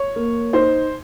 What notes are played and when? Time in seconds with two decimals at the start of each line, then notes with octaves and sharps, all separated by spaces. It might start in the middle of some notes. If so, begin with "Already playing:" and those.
Already playing: C#5
0.16 A#3
0.53 D#4 C5